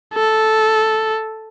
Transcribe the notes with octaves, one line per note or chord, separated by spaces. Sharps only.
A4